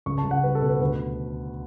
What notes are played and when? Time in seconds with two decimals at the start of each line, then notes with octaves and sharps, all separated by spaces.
0.06 C#2 C#6
0.18 A5
0.24 C#2
0.31 F#5
0.43 G3 B4
0.55 A4
0.62 B2
0.69 B4
0.80 D2 B4